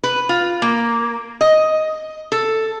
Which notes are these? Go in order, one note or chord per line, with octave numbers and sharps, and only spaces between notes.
B4
F4
A#3
D#5
A4